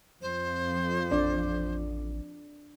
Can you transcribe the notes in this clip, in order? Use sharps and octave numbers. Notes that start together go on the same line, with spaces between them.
F2 C5
A1 D4 D5